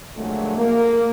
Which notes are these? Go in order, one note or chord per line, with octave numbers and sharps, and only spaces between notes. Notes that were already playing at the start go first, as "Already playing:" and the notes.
F2 A#2 D3 F#3 G#3 A3
A#3